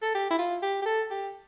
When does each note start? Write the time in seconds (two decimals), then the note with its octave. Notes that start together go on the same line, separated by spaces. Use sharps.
0.02 A4
0.15 G4
0.30 E4
0.38 F4
0.62 G4
0.82 G4
0.85 A4
1.10 G4